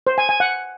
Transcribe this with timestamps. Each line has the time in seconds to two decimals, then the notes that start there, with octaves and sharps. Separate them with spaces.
0.07 C5
0.18 G#5
0.29 G#5
0.40 F#5